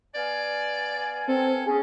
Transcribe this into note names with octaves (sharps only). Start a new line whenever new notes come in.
B3 D5 F5 G#5
C4 A4
C#3 B3 C#4 G#4